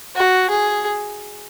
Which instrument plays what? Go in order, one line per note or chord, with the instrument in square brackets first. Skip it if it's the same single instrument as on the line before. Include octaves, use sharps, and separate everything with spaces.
[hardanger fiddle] F#4
G#4